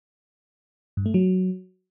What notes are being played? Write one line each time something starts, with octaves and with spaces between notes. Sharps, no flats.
G2
A3
F#3